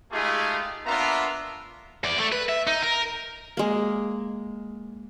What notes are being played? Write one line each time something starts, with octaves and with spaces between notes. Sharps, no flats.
G#3 A3 D#4 F4 G4 G#4
A#3 B3 D4 F4 E5 A#5
E2 D5
A3
B4
E5
D#4
A#4
G#3 A#3